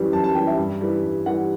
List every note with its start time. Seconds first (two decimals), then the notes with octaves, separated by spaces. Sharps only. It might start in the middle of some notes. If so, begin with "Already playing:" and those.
Already playing: F#2 E3 G3
0.12 F#2 A5
0.24 A5
0.35 E3 G3 G5
0.47 E5
0.58 G2
0.81 E3 G3
1.03 G2
1.26 E3 G3 F#5